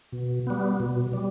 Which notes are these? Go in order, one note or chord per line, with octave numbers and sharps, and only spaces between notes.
B2
G3 B3
B2
G3